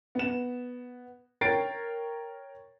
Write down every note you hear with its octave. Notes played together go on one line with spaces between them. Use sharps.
B3 E7
A#4 C#5 G5 A6 C7 D7